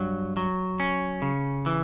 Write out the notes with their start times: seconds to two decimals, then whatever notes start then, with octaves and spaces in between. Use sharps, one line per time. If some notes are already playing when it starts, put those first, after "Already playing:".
Already playing: G2 F#3
0.37 F#3
0.80 C#4
1.22 C#3
1.66 E3